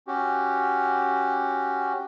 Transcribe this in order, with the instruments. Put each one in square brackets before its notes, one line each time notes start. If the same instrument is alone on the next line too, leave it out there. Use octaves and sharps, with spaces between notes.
[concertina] C#4 F#4 G4